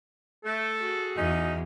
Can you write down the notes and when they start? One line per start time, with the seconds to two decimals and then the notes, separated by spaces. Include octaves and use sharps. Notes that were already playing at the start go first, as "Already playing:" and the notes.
0.45 A3 A4
0.79 F#4 G#4
1.17 E2 C#4 D#4